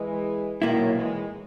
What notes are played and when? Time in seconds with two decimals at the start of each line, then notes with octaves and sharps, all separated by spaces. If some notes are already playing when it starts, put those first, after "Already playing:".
Already playing: E3 G#3
0.61 B1 A#2 D#3 F#3 A#3 E4
0.93 E3 G#3